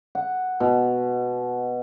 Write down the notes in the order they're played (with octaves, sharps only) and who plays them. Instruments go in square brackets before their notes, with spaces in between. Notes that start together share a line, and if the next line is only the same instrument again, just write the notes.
[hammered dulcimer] F#5
B2